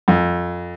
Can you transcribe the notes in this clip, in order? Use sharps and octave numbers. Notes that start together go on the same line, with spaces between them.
F2